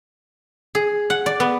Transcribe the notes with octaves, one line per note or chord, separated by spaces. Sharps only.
G#4
F#5
D5
B3